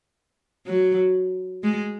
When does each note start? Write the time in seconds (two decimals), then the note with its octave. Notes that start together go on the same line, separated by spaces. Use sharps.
0.66 F#3
1.63 G#3